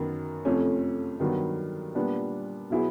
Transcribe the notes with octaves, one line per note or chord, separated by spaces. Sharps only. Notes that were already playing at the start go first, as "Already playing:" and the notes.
Already playing: F#2 D#3 F#3 B3
F2 C3 F3 A3 C#4
G2 D#3 F#3 B3
A#2 G3 B3 D4
B2 F#3 B3 E4 G#4